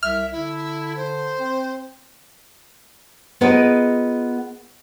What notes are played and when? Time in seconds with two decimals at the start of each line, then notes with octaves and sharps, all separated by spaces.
0.03 C2 E5 F6
0.32 D3 E4
0.96 C5
1.39 C4
3.41 B3 F4 G#4 A#4 B4 D#5